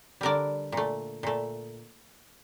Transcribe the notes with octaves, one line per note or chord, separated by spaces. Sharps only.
D3 G3 A#4 D5
A#2 A3
A#2 A3